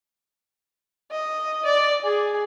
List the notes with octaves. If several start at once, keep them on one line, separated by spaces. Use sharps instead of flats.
D#5
D5
G#4